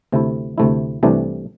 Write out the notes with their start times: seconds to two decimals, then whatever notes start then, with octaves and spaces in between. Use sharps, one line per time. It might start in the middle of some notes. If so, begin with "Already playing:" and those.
0.12 D2 C3 A3 E4
0.58 D2 C3 A3 E4
1.03 C2 C3 E3 A3 D4